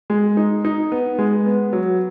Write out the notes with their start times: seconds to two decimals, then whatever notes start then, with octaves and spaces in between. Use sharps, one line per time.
0.10 G#3
0.37 D#4
0.65 D#4
0.92 B3
1.19 G#3
1.46 B3
1.73 F#3